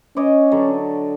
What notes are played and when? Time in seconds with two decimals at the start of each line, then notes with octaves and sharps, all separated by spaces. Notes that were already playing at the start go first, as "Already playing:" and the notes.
0.17 C#4 C#5 D#5 D6
0.51 D3 F#3 D4